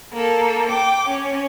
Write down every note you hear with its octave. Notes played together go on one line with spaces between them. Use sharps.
A#3 A4
G5 D6
C#4